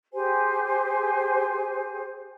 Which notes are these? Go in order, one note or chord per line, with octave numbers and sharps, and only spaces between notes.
G4 G#4 C5 G#5